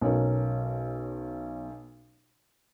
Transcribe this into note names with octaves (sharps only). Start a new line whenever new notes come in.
B1 C#4 A#4